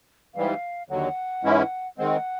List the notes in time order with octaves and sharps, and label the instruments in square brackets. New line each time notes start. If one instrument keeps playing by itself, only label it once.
[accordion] G#2 E3 G3 [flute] F5
[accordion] D#2 D3 F#3 [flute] F#5
[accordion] G#2 E3 G#3 C#4 E4
[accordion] D#3 G#3 C4 [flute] F#5